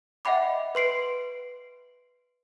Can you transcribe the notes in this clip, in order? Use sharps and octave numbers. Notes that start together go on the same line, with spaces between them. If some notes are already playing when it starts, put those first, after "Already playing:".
D#5 E5 F#5 G5 B5 D6
B4 C6 C7 D7